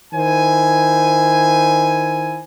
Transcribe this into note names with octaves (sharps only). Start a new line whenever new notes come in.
D#3 E4 C5 G#5